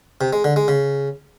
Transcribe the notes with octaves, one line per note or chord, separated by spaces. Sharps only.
C3
G#3
D3
G#3
C#3